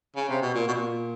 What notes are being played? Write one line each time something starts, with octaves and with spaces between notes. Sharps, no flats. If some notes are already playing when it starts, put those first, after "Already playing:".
C#3
C3
B2
A#2
B2
A#2